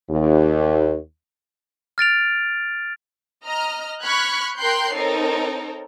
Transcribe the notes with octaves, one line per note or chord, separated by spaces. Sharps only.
D#2
F6 A6 D7 F7
D#5 A#5 F6
B5 C#6 F6 F#6 G#6 B6
A#4 G5 C6 F#6 G6 C7
C4 D#4 A4 A#4 C#5